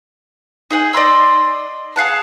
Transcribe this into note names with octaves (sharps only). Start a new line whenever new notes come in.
D#4 G#4 F#5 G#5
D5 D#5 C6 E6
G#4 F5 F#5 A5